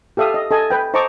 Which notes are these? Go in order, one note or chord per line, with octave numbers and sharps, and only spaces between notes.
G4 A4 E5 F5 D#6
D#5
A4 D#5 G#5
B4 G5
C5 D#5 A5 A#5 C#6 D6